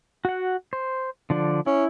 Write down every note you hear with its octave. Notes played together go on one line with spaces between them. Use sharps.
F#4 F#5
C5
D3 F3 D4
C#4 E4